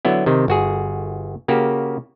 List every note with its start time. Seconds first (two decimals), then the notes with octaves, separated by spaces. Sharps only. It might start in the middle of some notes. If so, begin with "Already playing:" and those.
0.05 D3 F#3 B3 E4
0.26 C3 D#3
0.48 G1 F#4 G#4
1.48 C#3 A#3 F#4 G4